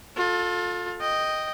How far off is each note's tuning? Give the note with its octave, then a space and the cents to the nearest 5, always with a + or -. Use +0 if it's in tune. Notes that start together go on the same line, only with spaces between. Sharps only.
F4 +30 A4 +0
D#5 +0 G5 +0